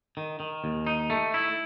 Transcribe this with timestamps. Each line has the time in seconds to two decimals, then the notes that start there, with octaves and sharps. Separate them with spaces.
0.17 D#3
0.40 D#3
0.64 D#2
0.87 D#4
1.10 A3
1.34 E4